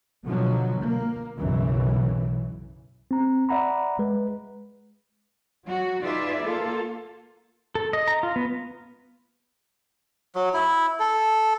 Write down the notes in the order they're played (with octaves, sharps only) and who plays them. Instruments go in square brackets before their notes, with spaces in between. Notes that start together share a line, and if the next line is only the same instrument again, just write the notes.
[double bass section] B2 D3 F3 F#3
A#3
B1 F#2 C#3 E3
[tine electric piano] C4 A#5
D5 E5 F#5 A#5 B5
G#3 B4
[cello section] F#3 F#4
D#4 F4 G#4 B4 D5 E5
A#3 F4 A4
[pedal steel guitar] A4
D#5
A#5
F4
B3
[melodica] F#3
E4
A4